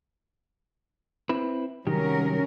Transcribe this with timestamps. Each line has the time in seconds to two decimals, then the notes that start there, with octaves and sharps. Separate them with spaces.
1.29 C4 E4 B4
1.87 C2 D#3 F#3 C#4 G4 A#4